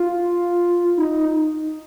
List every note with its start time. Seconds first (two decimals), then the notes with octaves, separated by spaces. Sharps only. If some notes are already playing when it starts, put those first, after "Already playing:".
Already playing: F4
0.97 D#4